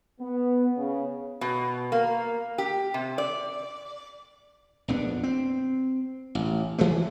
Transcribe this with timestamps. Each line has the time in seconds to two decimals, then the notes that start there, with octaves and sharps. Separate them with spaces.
0.20 B3
0.77 C#3
1.41 B2
1.92 A#3
2.58 G4
2.94 C3
3.18 D5
4.88 A#1 F2 B3 D4
5.23 C4
6.35 A1
6.78 E3 F3 G#3 A3